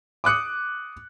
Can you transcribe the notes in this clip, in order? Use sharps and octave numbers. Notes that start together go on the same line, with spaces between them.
D6 D#6 F#6 C#7